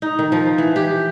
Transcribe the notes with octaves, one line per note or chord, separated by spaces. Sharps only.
D#4
D#3
F3
E3
G4